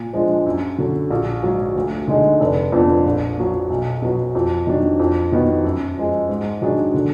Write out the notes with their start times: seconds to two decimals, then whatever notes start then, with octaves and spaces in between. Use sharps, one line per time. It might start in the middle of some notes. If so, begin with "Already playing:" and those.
Already playing: A#2
0.13 F3 G#3 D4
0.46 F#2
0.78 D3 F#3
1.10 A#1
1.43 G#2 F#3
1.76 D2
2.08 D3 G#3 D#4
2.40 F1
2.72 F2 F3 B3 D4
3.06 A#1
3.38 A#2 F#3
3.70 B1
4.02 B2 F#3
4.35 F2
4.67 D#3 F#3 D4
5.00 F2
5.32 D#3 F#3 B3
5.64 F#2
5.97 F3 G#3
6.29 G#2
6.62 D#3 F#3 D4 G#4
6.94 D3